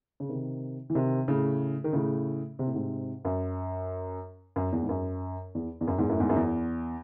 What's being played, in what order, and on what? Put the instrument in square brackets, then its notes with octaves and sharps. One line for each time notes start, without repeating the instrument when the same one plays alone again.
[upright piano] C#3
C3 D#3
E3
C3 D#3
A2 C#3
D#3
A2 C#3
C3
A2
G#2 C3
F#2
F#2
E2
G#2
F#2
E2
E2
F#2
E2 G#2
F#2 A2
E2 G#2
F#2
E2